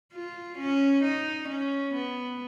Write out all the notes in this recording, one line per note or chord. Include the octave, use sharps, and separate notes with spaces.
F4
C#4
D#4
C#4
B3